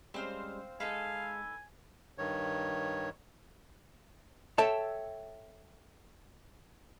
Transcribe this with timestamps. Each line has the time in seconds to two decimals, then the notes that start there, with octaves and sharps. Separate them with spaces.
0.14 G3 G#3 C4 C#4 C5 F5
0.80 G#3 D#4 A4 B4 F5 G#5
2.18 G2 D#3 C#5
4.58 A4 C#5 E5 G5 A5